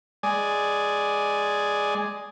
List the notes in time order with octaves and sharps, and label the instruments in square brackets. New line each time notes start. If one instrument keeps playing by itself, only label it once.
[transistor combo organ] G#3 D5 G#5